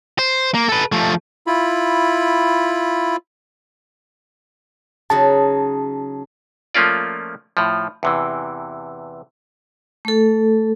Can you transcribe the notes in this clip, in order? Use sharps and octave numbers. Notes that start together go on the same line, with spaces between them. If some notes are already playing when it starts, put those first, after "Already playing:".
C5
A#3
A4 B4
F3 A3
E4 F4 B5
C#3 F#3 D#4 A5
F3 A3 A#3 C#4 F4 D5
A2 F3
E2 C3 E3
A3 A4